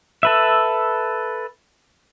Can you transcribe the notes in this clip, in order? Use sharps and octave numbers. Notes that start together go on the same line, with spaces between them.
A4 B4 E5